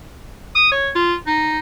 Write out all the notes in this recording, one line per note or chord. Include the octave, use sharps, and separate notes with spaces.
D#6
C#5
F4
D#4